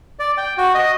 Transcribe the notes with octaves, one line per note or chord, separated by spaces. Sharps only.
D5
G5
F#4
D#5